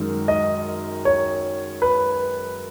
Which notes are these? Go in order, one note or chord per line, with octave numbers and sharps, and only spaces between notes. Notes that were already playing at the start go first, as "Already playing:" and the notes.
Already playing: F#2 D#3 G#3 D#4 A#4
D#5
C#5
B4